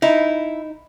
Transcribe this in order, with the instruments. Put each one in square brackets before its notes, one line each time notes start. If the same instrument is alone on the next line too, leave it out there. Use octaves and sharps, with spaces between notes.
[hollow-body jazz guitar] D#4 [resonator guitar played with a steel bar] E4